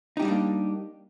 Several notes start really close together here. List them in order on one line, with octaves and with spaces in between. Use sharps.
D#4 G4 G3 D4 A#3